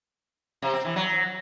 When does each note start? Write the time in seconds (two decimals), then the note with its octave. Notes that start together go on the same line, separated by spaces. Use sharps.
0.62 C3
0.74 C4
0.85 E3
0.96 F#3